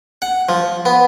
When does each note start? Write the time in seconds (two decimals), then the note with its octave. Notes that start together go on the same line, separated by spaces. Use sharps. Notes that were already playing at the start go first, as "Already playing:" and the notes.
0.22 F#5
0.49 F3
0.86 B3